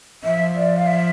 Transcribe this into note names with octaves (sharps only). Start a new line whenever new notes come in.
F3 E5
D5
F5
E5